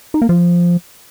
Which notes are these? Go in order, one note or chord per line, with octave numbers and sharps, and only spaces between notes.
D#4
A#3
F3